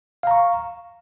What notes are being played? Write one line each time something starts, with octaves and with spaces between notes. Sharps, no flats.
F5 A#5 C#6